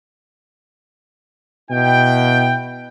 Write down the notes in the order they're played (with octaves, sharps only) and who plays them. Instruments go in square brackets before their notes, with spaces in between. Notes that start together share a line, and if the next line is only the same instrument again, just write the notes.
[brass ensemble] B2 E4 G5